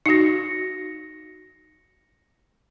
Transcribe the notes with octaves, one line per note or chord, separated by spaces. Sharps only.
D#4 F#4 A#6 C#7